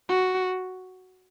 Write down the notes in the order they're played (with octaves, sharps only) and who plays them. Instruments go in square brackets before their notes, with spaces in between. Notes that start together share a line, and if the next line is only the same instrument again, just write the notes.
[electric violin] F#4